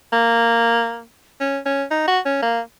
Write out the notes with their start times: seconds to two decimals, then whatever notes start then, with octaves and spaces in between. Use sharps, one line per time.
0.13 A#3
1.40 C#4
1.66 C#4
1.91 D#4
2.07 F#4
2.26 C#4
2.42 A#3